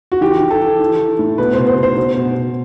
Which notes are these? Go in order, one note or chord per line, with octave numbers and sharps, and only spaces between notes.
F#4
E3 G4
E3
A4
E3
E3
E3
A2
B2 B4
B2 C5
C5
B2
C5
B2 C5
B2
B2